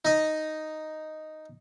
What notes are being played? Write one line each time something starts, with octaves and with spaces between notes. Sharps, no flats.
D#4 D#5